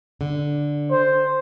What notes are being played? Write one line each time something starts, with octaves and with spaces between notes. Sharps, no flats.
D3
C5